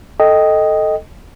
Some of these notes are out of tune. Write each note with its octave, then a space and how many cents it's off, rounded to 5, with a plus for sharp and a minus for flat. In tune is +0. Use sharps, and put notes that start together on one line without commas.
A4 +0 D#5 +0 G5 +0